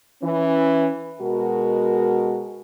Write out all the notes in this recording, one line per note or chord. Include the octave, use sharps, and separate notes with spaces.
E3 C#4
B2 G#3 F#4 A#4